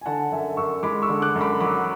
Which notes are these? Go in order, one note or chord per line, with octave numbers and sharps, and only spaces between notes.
G#5
D3 F#5 A5
F#2 E5 G#5
F#2 C#6 E6
G#3 B5 D6
C#6 E6
D3
D6 F#6
F#2
B5 D6
F#3 B5 D6